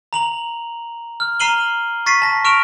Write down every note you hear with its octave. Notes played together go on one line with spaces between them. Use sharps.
A#5 F7 F#7
F6
A#5 F6 C7 D#7 F#7 G7
C#6 A6 B6 C7 D#7
A5 A#6
C#6 F6 D7 E7 F7